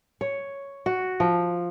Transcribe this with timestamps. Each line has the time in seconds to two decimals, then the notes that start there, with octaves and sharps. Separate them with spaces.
0.21 C#5
0.86 F#4
1.20 F3